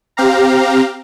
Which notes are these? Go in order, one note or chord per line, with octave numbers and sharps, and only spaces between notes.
C4 G4 F5 A#5